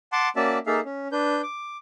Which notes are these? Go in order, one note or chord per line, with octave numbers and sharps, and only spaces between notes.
F#5 A5 C6 D6
A#3 C#4 F#4 D5 E5 A5
A#3 D#4 G#4 A4 E5 F5
C#4
D4 B4 G6
D6